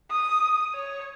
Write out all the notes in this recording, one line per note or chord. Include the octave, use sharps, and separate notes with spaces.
D#6
C#5